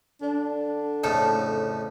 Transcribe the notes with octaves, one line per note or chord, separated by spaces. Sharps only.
D3 D4
F2 A2 C#3 A4